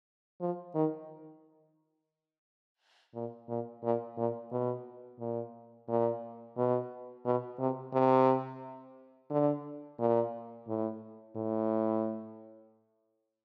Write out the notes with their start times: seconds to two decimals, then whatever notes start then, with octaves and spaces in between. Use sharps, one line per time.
0.41 F3
0.74 D#3
3.15 A#2
3.49 A#2
3.83 A#2
4.17 A#2
4.52 B2
5.20 A#2
5.88 A#2
6.57 B2
7.25 B2
7.59 C3
7.93 C3
9.30 D3
9.99 A#2
10.68 A2
11.36 A2